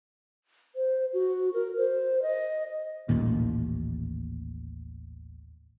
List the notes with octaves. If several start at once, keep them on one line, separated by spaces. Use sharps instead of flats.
C5
F#4
A#4
C5
D#5
D#1 A1 D#2 A#2